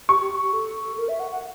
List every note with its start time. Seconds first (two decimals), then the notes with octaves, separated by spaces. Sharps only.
0.09 G4 C#6
0.20 G4
0.42 G4
0.53 A4
0.98 A#4
1.09 E5
1.20 F#5
1.31 F#5